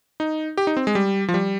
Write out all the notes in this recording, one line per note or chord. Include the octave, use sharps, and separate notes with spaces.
D#4
G4
D#4
C4
G#3
G3
F3
G3